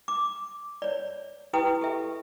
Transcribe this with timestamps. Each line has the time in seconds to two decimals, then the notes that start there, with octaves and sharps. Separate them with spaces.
0.08 D6
0.82 C#5 D5
1.53 E4 G4 B4 G5 D#6
1.81 G4 A4 E5